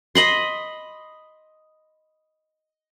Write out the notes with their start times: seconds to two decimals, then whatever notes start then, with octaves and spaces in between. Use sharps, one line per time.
0.15 D#5 B5 C6